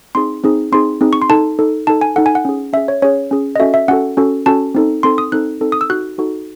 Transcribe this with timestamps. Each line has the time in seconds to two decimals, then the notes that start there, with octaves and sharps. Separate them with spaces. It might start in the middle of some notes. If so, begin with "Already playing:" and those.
0.15 C4 D#4 G#4 C6
0.44 C4 D#4 G#4
0.72 C4 D#4 G#4 C6
1.01 C4 D#4 G#4
1.13 C#6
1.22 C6
1.29 D#4 A4 A5
1.59 D#4 A4
1.87 D#4 A4 A5
2.01 G#5
2.16 D#4 A4 F#5
2.26 G#5
2.35 F#5
2.45 C#4 G#4
2.73 C#4 E5
2.77 G#4
2.88 C#5
3.02 C#4 G#4 C#5
3.31 C#4 G#4
3.56 D#5
3.59 C#4 F#4 A4 E5
3.74 E5
3.88 C#4 F#4 A4 F#5
4.17 C#4 F#4 A4
4.46 C#4 F#4 A4 A5
4.75 C4 D#4 A4
5.03 C4 D#4 A4 C6
5.18 D#6
5.32 C4 D#4 A4 F#6
5.61 C4 D#4 A4
5.72 D#6
5.81 E6
5.90 D#4 F#4 A4 F#6
6.18 D#4 F#4 A4